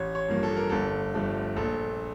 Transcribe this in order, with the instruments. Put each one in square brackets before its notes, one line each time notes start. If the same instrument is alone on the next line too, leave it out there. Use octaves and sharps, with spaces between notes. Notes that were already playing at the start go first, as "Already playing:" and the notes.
Already playing: [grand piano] A1 C#5
C#5
G2 F3 A#3
A4
A#4
G1 A4
G2 F3 A3
A#1 A4